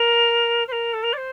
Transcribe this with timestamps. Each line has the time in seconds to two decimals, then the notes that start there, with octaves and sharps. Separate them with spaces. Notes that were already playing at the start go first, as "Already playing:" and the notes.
Already playing: A#4
0.68 C5
0.72 A#4
0.93 A4
1.03 A#4
1.13 D5
1.17 C5